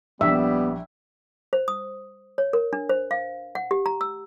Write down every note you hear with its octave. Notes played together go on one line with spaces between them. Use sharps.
A#1 G3 B3 E5
C5
D#6
C#5
A#4
D4
C5
F5
F#5
G4
A#5
E6